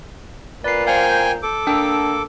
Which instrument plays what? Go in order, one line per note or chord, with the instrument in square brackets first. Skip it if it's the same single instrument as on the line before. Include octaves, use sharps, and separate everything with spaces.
[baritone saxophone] A#2 [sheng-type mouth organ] B4 [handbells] D5 C7
[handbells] C5 F5 [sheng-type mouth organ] G5 G#5
[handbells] G6
[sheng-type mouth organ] A4 D6
[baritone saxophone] A#3 [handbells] D4 G5 E6